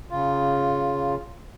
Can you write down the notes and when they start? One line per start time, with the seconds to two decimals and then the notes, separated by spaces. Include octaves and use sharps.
0.10 C#3 F4